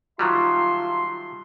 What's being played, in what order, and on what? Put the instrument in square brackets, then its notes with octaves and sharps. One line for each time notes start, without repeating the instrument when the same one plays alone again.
[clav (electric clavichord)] D#3 F#3 G3 [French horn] F4 [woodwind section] E5 A5 C6